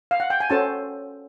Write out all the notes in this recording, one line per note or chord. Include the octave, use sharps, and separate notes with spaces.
F5
F#5
G5
G#5
C#4 F#4 A4 C5 A5